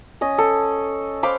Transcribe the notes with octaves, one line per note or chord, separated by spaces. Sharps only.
C#4 D#5
A4
C5 F5 B5 D6